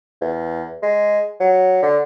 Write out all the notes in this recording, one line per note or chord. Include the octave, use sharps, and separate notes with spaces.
E2
G#3
F#3
D3